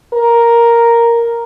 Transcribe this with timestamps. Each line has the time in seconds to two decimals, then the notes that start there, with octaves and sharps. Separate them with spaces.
0.14 A#4